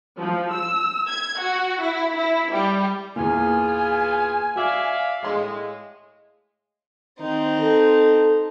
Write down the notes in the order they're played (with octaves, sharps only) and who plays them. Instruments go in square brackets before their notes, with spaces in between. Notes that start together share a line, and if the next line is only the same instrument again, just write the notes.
[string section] F3
E6
G#6
F#4
E4
E4
G3
[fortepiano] E2 A#2 [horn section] B3 F4 G#4 [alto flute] G#5
[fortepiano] F#4 [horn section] D5 E5 F5
[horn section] A2 G#3 [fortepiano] F5 C6
[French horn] D#3 [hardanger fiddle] C4 D#4
[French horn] A4